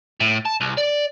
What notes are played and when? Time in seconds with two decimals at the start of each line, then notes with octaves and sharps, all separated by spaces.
0.20 A2
0.45 A5
0.61 C2
0.77 D5